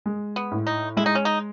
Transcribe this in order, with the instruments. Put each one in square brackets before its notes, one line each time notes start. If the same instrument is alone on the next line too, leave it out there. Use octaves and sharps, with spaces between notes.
[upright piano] G#3
[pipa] B3
[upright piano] A2
[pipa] D#4
[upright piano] G#3 [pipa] E4
[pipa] D#4
C#4
D#4